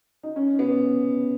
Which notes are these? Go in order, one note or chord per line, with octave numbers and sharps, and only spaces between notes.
D#4
C#4
B3